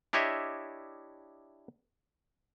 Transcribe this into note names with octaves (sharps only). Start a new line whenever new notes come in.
D4 E4 G4 C#5 D#5 E5